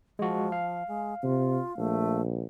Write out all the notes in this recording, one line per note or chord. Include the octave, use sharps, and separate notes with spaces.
F3 G#3 F#4
F5
G#3
C3 F4
A#1 A3